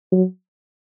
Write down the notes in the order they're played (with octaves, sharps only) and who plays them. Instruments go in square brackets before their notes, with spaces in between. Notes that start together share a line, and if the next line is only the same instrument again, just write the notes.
[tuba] F#3